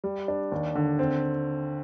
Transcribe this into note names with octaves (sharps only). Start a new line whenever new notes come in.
G3
D4
D#2
D3
C4